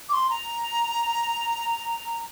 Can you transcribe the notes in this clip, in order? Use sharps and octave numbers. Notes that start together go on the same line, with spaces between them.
D6
C6
A#5